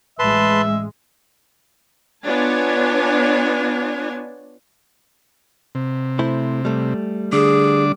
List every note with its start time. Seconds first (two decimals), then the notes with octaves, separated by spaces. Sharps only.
0.19 A1 G#3 B4 E5 A5 C6
2.24 B3 D4 F4 C#5 G#5 A5
5.75 C3
6.19 A3 E4 C5
6.65 G3 A3
7.33 D3 D4 G#4 D6